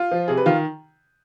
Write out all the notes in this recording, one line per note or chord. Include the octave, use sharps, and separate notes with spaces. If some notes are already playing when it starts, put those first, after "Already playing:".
Already playing: F4
F3
C3 G#4
B4
D#3 F4